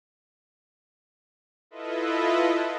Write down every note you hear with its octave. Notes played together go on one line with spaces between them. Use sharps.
E4 F4 A4 B4 D#5 E5